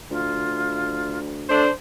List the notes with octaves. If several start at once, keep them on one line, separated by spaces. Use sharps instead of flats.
D2 F4
A3 D4 C5